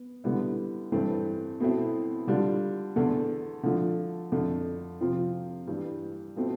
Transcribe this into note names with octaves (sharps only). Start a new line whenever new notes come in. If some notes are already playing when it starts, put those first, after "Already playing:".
Already playing: B3
D3 G3 B3 E4
G2 E3 A3 C4
B2 A3 C4 E4
D3 G3 D4 F4
E2 D3 A3
D3 F3 A3
F2 D3 A3
C3 F3 C4 F4
G2 E3 G3
B2 A3 C4 F4